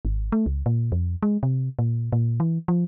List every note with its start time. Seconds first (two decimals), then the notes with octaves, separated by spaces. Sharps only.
0.05 G#1
0.32 A3
0.46 C#2
0.66 A#2
0.92 F2
1.23 G#3
1.43 C3
1.79 A#2
2.12 A#2
2.40 E3
2.68 F3